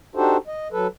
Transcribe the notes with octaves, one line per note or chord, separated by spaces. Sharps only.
D4 D#4 F#4 G4 A4 C5
D#5
F#3 A4 B4